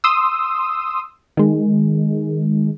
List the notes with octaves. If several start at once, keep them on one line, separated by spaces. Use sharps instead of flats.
C6 D#6 E6
D#3 G#3